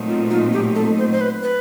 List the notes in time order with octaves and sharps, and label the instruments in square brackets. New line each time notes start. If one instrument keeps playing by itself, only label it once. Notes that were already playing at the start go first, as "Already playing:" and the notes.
Already playing: [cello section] A#2 F#3 A3 C4 D#4
[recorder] F4
F4
G4
A4
C5
C5
B4
B4